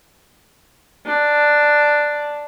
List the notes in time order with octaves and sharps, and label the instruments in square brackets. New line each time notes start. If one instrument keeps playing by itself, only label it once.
[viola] D4